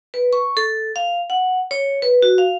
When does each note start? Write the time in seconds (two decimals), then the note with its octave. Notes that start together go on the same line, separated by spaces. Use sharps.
0.14 B4
0.33 C#6
0.57 A4
0.96 F5
1.30 F#5
1.71 C#5
2.02 B4
2.22 F#4
2.38 F5